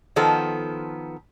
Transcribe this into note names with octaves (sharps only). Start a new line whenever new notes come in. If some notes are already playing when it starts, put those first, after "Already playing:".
D#3 F3 B3 A4 C5